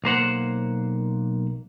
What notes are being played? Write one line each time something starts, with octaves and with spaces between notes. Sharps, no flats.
B1 A#3 C5 F#5